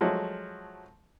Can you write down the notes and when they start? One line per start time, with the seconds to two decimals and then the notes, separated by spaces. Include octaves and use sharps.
0.01 F3 F#3 G#3 A3